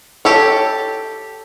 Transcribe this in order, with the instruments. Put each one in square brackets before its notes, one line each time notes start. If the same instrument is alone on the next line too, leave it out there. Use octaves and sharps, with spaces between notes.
[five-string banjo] G4 A4 C#5